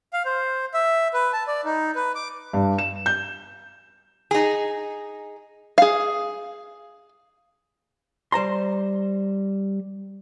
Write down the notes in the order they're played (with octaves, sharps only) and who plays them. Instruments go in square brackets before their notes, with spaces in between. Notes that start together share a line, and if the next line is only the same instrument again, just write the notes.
[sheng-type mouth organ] F5
C5
E5
B4
A5
D5
D#4
B4
D6
[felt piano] G2
E7
G6
[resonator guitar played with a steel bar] D#4 G#4
[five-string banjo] G#4 F5
[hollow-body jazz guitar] G3 C5 A#5 C6